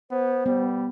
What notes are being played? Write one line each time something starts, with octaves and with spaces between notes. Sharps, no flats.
B3 C5
G3 B3